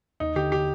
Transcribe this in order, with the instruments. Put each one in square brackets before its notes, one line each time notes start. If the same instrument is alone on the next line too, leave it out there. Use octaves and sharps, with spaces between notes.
[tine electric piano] D#2 [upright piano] D#4
[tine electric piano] D3 [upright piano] G4
[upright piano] G4